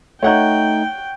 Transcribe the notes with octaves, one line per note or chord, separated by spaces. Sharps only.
A3 D#4 C#5 F#5 G5 G6